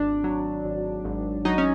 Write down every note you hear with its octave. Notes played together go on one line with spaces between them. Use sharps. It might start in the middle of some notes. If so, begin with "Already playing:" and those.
Already playing: G#1 D4
F#3
G#1
G#1
F#3 D#4
C#4